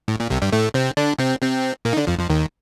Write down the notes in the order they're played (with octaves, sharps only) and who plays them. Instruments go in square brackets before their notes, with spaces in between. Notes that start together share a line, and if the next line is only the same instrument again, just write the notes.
[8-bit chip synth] A2
A#2
C2 C3
G2 G3
A2 A3
C3 C4
D3 D4
C3 C4
C3 C4
A#2 A#3
D#4
D3 D4
F2 F3
F2 F3
D#2 D#3